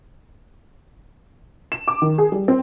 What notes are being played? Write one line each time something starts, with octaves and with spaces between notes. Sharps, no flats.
E7
D6
D#3
G#4
G3
C4